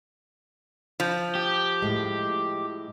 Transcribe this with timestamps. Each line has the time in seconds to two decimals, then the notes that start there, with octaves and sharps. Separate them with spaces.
1.00 F3
1.35 G4
1.82 A2 G#3